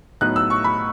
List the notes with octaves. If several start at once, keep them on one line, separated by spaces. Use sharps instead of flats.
A2 F#3 B3 D#4 F#6
E6
C#6
B5